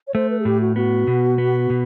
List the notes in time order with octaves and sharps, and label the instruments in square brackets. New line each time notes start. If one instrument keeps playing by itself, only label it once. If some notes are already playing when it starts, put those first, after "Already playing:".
[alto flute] C#5
[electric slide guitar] A3 [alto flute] C5
[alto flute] B4
G#4
[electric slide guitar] A2 [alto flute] G4
[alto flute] F#4
[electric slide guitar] B3 [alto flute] F#4
[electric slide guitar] B2
B3
B2